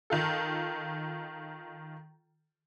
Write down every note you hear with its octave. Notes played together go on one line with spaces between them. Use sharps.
D#3 F4 A4